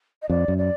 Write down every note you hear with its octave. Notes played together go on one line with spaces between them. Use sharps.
D#5
F2 D5
F#2
D5